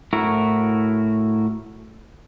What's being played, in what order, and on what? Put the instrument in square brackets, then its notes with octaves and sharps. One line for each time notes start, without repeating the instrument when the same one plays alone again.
[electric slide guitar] A2 E4 F#4 A#4